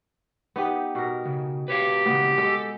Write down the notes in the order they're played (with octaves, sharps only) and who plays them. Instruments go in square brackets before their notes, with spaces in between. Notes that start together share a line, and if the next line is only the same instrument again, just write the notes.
[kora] B3 D#4 G4
B2 A#4
[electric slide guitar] C#3
[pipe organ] G4 [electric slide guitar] B4 C#5 F5
[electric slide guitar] C#3 E3 A#3 [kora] B3
[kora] G#3 [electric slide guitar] A4